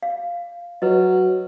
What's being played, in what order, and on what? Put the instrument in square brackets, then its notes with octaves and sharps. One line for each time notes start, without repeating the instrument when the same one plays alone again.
[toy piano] F5
[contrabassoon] F#3 [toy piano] B4 D#5